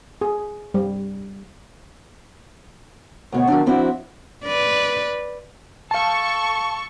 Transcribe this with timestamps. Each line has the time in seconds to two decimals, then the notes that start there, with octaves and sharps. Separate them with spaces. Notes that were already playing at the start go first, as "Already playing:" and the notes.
0.21 G#4
0.74 G3
3.32 D2 B2 C#5
3.48 D#3 F#3 D4
3.66 F3 C4 D4 E4 F#4 E5
4.45 B4 D5
5.91 A4 F5 A5 C#6